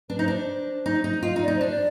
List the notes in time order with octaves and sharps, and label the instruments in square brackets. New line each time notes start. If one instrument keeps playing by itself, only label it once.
[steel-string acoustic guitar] D4 [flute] B4
[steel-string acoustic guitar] D#4 [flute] C5
[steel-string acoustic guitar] D4
[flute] C5
[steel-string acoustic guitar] D#4
D#4
[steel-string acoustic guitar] F4 [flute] D#5
[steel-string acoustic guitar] D#4
[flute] D5
[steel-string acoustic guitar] D#4
[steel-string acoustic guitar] D4 [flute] C5
[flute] D5